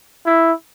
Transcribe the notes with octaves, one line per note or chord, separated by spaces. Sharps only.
E4